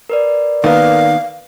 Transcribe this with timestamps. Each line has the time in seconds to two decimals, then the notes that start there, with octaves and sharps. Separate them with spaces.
0.10 A#4 B4 D5
0.64 D#3 A#3 B3 F5